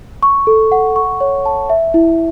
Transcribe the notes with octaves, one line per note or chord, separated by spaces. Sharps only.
C#6
A4
F#5
C#6
C#5
A5
E5
E4